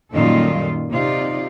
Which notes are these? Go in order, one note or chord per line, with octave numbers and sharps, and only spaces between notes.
F#2 A#2 D#3 G3 F4 A4
C3 D#4 F4 D5